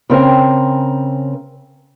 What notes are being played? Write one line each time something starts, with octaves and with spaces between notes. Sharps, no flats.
C#3 C4 A#4 G5